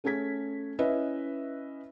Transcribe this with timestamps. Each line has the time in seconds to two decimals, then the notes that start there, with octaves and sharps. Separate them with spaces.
0.04 A3 C#4 G#4 G#6 B6
0.79 C#4 E4 B4 D#5 E5